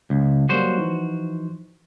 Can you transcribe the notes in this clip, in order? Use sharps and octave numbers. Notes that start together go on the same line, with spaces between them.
C#2
F#3 G3 A#3 F#4 C5
E3 F3 D#4